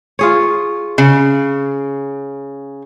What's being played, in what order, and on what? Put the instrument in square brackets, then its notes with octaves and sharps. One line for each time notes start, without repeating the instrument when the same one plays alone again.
[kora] F4 G#4 C#5
[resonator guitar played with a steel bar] C#3